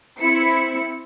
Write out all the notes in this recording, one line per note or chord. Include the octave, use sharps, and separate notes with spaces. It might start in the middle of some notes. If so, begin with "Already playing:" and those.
C4 E4 C#7